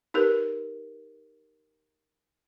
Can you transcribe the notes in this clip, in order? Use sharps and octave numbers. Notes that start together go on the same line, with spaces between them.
D#4 G4 A#4 B4